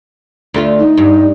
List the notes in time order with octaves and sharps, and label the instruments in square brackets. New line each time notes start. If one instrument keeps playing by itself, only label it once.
[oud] D2 A3 F4
[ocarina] D#4
[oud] G2